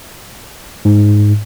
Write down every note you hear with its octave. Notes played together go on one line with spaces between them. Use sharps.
G#2